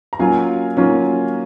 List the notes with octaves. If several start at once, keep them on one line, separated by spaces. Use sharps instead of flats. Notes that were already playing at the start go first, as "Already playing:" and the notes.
A#5
F#3 A#3 C#4 F4 F5 G#5
F#3 A#3 C#4 F4